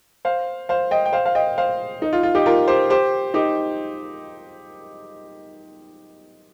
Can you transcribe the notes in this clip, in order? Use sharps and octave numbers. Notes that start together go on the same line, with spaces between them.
C5 F5
C5 F5
D#5 G5
G5
C5 F5
F5
D#5 G5
C5 F5
D#4
F4
F4
D#4 G4
F4 A#4
G4 C5
G4 C5
D#4 G4